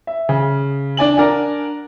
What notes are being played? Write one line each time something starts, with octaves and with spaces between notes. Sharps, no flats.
E5
C#3
D4 D5 G#5 F#7
D4 A#4 D5 F#5 G#5